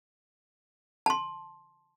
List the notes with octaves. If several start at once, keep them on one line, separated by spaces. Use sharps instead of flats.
A5 C6